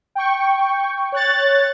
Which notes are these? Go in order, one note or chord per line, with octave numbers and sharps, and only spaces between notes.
G5 C#6
C#5 F#6 A6